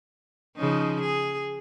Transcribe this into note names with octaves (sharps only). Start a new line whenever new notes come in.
C#3 F3 D#4
G#4